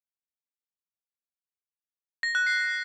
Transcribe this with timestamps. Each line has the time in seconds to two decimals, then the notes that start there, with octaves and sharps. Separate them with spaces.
2.23 A#6
2.35 F#6
2.47 C7